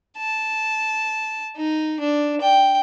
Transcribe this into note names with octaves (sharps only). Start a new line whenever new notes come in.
A5
D#4
D4
G5